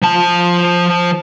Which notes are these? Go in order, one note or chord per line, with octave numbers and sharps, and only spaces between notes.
F3 A5